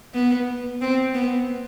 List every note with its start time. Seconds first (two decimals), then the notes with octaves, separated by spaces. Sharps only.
0.14 B3
0.81 C4
1.14 B3